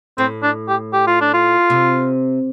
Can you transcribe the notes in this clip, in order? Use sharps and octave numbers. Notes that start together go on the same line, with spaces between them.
A2 C4
D4
G4
G4
F4
D4
F4
C3